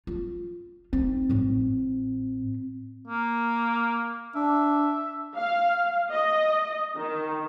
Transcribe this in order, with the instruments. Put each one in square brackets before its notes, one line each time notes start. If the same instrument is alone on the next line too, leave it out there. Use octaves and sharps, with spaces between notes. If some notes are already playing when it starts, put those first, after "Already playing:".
[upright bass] F4
[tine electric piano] C4 [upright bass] D#4
[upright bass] A1 A2
[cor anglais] A#3
[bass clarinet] D4 [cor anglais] E5
[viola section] F5
D#5
D#3